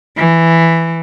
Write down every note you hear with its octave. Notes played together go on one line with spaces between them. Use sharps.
E3